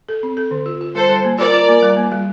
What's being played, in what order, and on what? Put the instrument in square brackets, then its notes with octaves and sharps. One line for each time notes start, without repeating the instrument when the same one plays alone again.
[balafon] A4
C4
A4
D3
F4
F4
[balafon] G3 [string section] A4 C5
[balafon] G3
A#3
[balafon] F4 [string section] A#4 D5
[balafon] F4
A#3
G3
A#3
G3